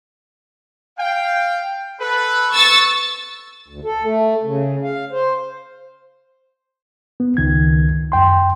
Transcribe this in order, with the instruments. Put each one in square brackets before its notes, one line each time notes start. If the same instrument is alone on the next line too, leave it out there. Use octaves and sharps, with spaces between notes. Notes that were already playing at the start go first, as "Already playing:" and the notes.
[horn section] F5 G5
A4 B4
[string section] C#6 E6 A6
[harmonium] D2
A4
A3
C#3
F5
C5
[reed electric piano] B3
C#2 D#3 G#6
F#2 G5 C6